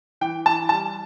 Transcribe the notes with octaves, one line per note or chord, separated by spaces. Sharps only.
E3 G5
E3 A5
G3 A5